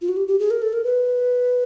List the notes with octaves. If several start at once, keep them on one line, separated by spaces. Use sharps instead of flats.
F4
F#4
G4
G4
G#4
A#4
A4
A#4
B4